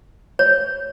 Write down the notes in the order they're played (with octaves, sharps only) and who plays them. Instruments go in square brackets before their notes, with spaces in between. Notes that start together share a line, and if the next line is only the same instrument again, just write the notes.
[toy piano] C#5